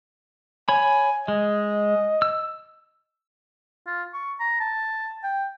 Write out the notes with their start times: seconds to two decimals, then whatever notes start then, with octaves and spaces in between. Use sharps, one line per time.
0.69 C#5 G#5 B5
1.28 G#3 D#5
2.22 E6
3.87 F4
4.14 C#6
4.40 A#5
4.60 A5
5.24 G5